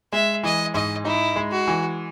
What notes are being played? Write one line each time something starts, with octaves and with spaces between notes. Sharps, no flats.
G#3 E5
E3 D#5
G#2 D#5
D#4 E4
G#3
F#4
E3